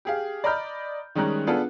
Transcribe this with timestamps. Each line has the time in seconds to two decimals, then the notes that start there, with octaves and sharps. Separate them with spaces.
0.05 G4 G#4 F5
0.44 D5 D#5 A#5 B5 F6 G6
1.15 D#3 G3 G#3 C#4 A#5 F#6
1.47 B3 D4 F4 G#4 A4